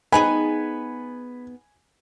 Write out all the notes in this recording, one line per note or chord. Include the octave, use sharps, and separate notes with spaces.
B3 D#4 G#4 G#5 B5